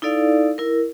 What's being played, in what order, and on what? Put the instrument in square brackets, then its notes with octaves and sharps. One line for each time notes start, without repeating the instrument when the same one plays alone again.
[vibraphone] D#4 E4 A4 D5 F5
E4 A#4